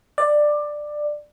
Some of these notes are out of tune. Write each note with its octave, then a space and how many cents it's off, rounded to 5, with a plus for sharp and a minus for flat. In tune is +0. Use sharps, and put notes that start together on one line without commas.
D5 +15